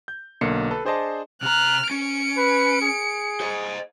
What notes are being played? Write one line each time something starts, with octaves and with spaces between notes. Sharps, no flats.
G6
B1 D3 A#3 C7 C#7
A4 B4
D4 G#4 C5 D5 D#5 A5
C3 A#5 F6 F#6
C#4 C#7 D7
B4
G#4
C5 D#5